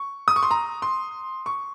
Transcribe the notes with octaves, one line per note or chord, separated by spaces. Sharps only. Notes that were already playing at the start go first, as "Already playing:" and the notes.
Already playing: C#6
D#6
C#6
C6
A#5
C6
C#6